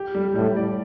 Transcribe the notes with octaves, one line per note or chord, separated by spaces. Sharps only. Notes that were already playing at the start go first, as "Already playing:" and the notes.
Already playing: G4
G3
A2 G3
D5